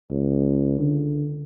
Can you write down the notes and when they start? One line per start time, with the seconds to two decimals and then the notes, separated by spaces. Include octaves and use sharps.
0.11 C#2
0.79 D3